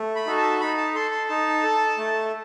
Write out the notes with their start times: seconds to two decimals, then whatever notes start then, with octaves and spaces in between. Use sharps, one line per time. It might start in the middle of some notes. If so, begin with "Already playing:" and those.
Already playing: A3
0.16 B5
0.26 D#4 F#4 A4
0.38 A5
0.61 D#4 B5
0.77 A5
0.95 A4 C6
1.11 C6
1.29 D#4 A5
1.63 A4
1.98 A3